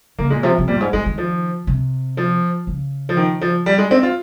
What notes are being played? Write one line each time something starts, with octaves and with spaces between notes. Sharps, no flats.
C#3 A#3
A#2 G#3
C3 F3
C3
A#2 G3
G2
G#2
G#2 G#3
D#3
F3
C3
F3
C#3
F3
D#3
F3
G3
G#3
C4
F4